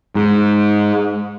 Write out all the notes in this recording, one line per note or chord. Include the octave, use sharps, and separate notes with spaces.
G#2